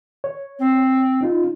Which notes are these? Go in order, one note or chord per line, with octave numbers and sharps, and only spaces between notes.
C#5
C4
C#4 D#4 F4